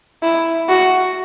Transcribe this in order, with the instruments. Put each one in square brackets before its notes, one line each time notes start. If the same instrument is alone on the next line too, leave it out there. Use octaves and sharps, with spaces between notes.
[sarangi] E4
F#4